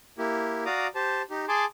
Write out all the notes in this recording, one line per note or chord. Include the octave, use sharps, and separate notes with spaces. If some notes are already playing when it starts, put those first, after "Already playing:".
A#3 E4 G4
F#4 D5 F5 A#5 D6 D#6
G4 C5 A5
D#4 G4
G#4 G#5 A5 C6 D6